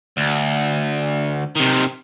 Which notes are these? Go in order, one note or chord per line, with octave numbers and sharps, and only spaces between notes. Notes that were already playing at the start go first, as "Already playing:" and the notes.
D2
C3 D#3